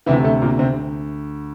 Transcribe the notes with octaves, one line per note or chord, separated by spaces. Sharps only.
D2 C3 E3 E4
A3
A#2 A#3
C3 C4